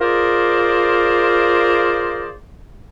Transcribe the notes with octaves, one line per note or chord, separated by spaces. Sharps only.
F4 G#4 A#4 C5 D5